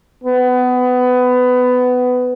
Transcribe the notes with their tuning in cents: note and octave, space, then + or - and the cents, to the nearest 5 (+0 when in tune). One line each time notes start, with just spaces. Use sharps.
B3 +20